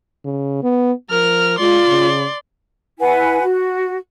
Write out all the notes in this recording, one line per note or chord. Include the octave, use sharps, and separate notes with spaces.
C#3
B3
F3 A#4 F6
G#3 F4 D5 C6
C#3
E4 B4 F#5 G#5
F#4